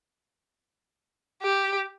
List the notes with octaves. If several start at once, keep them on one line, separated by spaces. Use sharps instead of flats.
G4